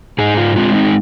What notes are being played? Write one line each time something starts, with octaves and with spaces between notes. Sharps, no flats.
G#2 D#4 G#4
F4
G#3 C4 F4
D#4